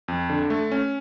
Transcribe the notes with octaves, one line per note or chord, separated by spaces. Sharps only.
F2
D3
A3
C#4